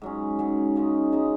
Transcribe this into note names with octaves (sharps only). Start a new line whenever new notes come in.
G#2 F#3 C#4
G#2 F#3 C#4
C#3 G#3 D#4
C#3 G#3 D#4